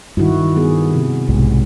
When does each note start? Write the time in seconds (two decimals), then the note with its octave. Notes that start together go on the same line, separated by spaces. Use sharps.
0.17 G2 D#3 E4 F#4
0.56 G3 B3 G#4
0.94 C3
1.29 B1 G#2 C3